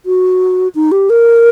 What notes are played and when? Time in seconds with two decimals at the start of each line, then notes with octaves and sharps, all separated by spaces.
0.06 F#4
0.75 D#4
0.92 G4
1.10 A#4